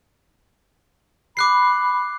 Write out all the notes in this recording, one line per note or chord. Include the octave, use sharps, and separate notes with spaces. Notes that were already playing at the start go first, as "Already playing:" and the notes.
B5 D6 F#6 C7